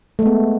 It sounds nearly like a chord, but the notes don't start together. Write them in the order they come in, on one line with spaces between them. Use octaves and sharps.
A3 G#3 B3